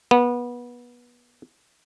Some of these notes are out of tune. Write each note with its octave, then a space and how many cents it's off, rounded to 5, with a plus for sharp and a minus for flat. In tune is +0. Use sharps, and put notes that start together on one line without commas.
B3 -25